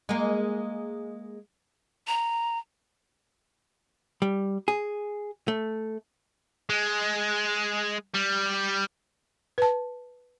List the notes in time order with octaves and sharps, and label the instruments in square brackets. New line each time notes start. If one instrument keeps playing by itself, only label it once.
[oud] G#3 A#3
[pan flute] A#5
[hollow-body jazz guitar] G3
G#4
A3
[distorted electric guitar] G#3
G3
[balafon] B4 A5